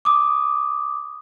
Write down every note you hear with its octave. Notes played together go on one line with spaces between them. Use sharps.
D6 D#6